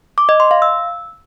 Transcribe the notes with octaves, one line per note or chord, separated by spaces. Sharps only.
D6
D#5
C6
F5
E6